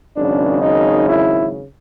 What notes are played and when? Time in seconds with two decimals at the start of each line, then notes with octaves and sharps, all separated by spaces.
0.17 G#1 F#2 C#3 D4
0.62 D#4
1.08 E4